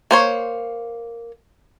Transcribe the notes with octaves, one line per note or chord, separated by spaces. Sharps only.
A#3 C5 C#5